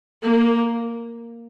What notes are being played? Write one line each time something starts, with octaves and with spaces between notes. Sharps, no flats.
A#3